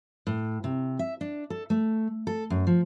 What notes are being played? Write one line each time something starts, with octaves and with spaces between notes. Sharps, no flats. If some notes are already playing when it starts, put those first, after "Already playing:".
A2
C3
E5
D4
A4
A3
A4
F#2
F3